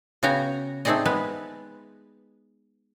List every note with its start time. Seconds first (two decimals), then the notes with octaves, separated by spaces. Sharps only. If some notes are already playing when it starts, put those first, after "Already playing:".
0.23 C#3 B3 F#4 G5 G#5 A#5
0.85 A3 C4 D#4 G#4 D5 D#5
1.05 G#3 B3 B4